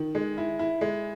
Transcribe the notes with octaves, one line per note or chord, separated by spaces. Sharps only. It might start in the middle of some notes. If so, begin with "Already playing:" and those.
Already playing: D#3
G#3
E4
E4
G#3